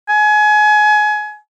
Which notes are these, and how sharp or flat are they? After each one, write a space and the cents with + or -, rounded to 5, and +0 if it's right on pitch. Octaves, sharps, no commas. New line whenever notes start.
G#5 +25